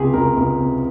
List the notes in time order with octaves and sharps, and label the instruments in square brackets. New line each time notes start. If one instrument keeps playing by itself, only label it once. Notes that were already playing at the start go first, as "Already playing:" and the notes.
Already playing: [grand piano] C#2 C3 G4 G#4
C#2 A#4
C#2
C3